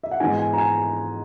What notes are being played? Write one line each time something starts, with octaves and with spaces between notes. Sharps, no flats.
E5
F#5
G#2 E3 B3 D#4 G#5
G#5
A#5
G#5